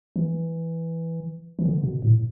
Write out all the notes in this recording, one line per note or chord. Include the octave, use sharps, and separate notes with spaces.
E3
E3
D3
B2
A2